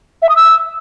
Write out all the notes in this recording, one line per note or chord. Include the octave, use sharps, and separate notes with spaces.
E5
D#6
E6